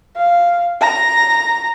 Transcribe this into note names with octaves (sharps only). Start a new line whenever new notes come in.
F5
A#5